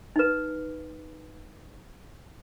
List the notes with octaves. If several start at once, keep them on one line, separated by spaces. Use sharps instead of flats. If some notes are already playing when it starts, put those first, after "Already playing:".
D#4 B4